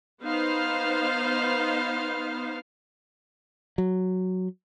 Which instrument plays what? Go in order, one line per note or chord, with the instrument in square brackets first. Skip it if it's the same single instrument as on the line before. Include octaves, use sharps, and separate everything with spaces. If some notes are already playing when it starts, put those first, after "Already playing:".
[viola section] B3 D#4 C5 F5
[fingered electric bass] F#3